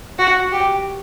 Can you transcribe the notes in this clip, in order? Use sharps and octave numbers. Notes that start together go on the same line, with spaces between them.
F#4
G4